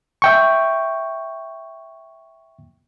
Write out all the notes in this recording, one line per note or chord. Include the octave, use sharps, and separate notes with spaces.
E5 G5 C#6